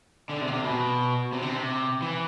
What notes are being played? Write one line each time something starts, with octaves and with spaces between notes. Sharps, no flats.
D3
C3
D3
C3
B2
C3
D3
C3
E3